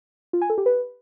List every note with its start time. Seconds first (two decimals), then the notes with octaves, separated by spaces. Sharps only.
0.33 F4
0.41 G#5
0.50 A4
0.58 G4
0.66 B4